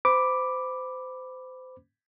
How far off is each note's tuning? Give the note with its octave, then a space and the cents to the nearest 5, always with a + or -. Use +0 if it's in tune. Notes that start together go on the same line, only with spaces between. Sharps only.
C5 -30 B5 +0 D6 +0